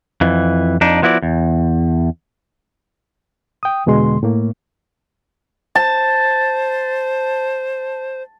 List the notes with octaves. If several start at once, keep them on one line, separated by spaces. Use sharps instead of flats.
F2 E3
F2 D4 D#4
F3 B3 E4 F#4 D5
E2
G5 D#6
E2 B2 D3 G#3 C6
A2 A3 A#3
C5 A5